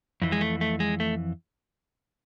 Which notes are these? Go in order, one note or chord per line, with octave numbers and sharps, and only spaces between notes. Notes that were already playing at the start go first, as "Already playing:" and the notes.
F2 E3
G#3
A3
A3
G#3
A3